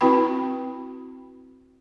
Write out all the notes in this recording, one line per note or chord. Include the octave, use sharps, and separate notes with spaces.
C4 E4 F#4 B4 G5 B5